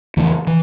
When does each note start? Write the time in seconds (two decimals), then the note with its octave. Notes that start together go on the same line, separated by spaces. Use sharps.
0.17 F2 C#3 E3 A3
0.47 E3